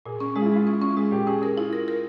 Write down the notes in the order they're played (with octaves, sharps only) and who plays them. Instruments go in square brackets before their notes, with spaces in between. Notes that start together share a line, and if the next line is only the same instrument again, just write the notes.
[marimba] A#2 [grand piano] G#4
[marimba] C#4
[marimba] G#3 [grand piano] G#4
[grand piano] F4
E4
[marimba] G#3 [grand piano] F4
[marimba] C#4
C#4
[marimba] G#3 [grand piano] G#4
[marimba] A#2 [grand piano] G4
[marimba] C#4 [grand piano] G#4
[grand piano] G#4 [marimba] A#4
[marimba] E4 [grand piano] F4
[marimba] A#4
A#4